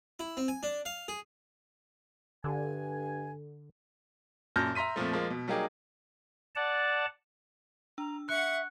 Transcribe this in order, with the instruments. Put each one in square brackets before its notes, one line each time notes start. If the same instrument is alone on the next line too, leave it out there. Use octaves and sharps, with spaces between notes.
[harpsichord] E4
C4
G#5
D4
F5
G#4
[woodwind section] G2 G#5 [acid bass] D3
[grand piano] F#2 A#2 A5 F6 G6 A#6
E5 A#5 C6 B6 D#7
F2 A#2 F3 A3
F3 G#3 A#3
B2
F#3 G3 A#3 D#4 G4 G#4
[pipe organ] D5 F#5 A5
[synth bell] D4 E6 [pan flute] A#5
[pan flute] E5 [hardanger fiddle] F#5 C#6 [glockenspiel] F#6